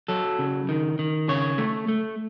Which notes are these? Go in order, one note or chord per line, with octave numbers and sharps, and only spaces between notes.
F#3 A4
C#3
D#3
D#3
C#3 C#5
A3
A3